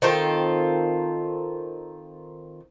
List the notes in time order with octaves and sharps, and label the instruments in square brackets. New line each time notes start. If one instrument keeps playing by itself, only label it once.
[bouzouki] D#3 C4 F4 A4